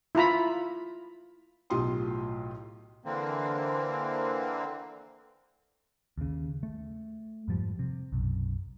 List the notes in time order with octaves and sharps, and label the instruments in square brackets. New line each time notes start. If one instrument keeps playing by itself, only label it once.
[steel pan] E4 F4 A#5 B5
[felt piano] B1 A2 F4 G4 C6 D#6
[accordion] D3 E3 A#3 C4
[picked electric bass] D#2 C#3
A3
F2 G#2 F3 G3
C3
B1 F#2